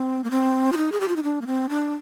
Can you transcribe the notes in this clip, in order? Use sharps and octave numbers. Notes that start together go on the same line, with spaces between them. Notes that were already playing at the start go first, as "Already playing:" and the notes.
Already playing: C4
A#3
C4
F4
D#4
G#4
G4
F4
D#4
D4
A#3
C4
D4